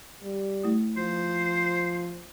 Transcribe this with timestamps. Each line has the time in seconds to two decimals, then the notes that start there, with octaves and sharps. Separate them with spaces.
0.23 G3
0.63 A3 E4 D#6
0.97 F3 C5